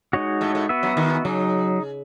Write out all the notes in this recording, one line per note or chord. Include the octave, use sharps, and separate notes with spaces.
G#3 D#4 F#4 C#5
A2 A3
A2 A3
B3 F#4 B4 E5
F#2 F#3
D#2 D#3
C#3 F#3 D#4